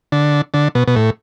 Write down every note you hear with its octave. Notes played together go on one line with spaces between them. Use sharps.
D3
D3
B2
B2
A2